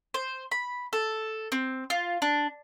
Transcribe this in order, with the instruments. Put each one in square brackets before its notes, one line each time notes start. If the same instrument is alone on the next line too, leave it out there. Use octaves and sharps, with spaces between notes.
[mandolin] C5
B5
A4
C4
F4
D4